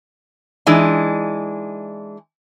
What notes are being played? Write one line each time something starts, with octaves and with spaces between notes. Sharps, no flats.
E3 G#3 D4 D#4